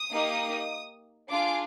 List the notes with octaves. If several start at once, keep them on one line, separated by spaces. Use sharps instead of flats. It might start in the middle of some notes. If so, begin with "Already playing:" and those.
Already playing: D#6
A#3 D#4 G4
D4 F4 G#4 D6